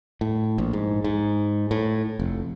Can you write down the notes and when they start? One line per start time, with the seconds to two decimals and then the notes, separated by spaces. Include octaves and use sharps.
0.21 A2
0.58 A#1
0.73 G#2
1.04 G#2
1.71 A2
2.20 F1